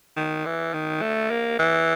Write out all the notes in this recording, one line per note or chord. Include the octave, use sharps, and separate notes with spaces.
D#3
E3
D#3
A3
A#3
E3